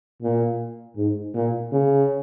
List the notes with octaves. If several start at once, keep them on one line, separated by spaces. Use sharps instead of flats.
A#2
G#2
A#2
C#3